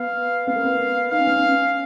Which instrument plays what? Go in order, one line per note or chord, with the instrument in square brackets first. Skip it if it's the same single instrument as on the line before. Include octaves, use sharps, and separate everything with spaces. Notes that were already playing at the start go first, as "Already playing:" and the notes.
Already playing: [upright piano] B3 [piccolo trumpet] F5
[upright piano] B3 [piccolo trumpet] F5
[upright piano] A#3
B3
[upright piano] D#4 [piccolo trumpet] F5
[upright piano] C#4
B3
C#4